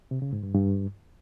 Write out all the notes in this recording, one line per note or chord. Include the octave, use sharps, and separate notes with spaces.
C3
C#3
G#2
G2
G2